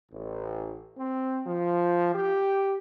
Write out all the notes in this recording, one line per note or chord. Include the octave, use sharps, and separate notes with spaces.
A1
C4
F3
G4